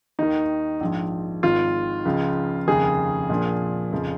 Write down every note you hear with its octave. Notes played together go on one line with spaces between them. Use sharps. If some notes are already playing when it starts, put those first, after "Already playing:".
D#2 D#3 D#4
A#1 G#2 F3
G#1 G#2 D#3 F4
C#2 C#3 F3
F1 D#2 C#3 F3 G#4
A#1 A#2 F3
F1 C#3 F3